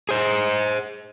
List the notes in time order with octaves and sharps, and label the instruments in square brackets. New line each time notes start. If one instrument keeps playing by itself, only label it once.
[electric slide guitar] G#4 C5